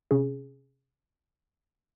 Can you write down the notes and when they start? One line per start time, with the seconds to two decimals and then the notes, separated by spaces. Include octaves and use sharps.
0.11 C3 C#4 G#4